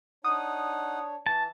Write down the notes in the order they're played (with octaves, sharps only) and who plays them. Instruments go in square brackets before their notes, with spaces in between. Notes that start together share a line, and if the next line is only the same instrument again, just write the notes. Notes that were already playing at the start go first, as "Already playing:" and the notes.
[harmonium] D4 C#5 [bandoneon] D#4 F#5 [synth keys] D#6
[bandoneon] E3 [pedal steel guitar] A5